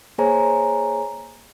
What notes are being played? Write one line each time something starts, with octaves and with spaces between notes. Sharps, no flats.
A#3 G#4 C5 C#5 G#5 A#5